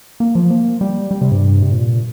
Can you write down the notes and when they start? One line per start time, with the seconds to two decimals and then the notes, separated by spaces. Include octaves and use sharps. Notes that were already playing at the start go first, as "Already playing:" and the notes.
0.20 A#3
0.35 F3
0.50 A#3
0.81 G3
1.11 G3
1.21 C3
1.31 G2
1.62 C3
1.71 A#2